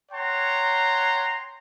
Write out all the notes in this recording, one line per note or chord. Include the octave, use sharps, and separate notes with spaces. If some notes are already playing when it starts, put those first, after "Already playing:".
C#5 F#5 G5 A#5 C6